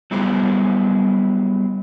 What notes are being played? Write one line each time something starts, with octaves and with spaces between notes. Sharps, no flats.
F#3 G3 B3 E4 G#4 C5